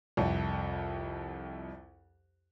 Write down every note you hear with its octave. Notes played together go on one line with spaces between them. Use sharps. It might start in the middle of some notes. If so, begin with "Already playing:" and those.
C2 F2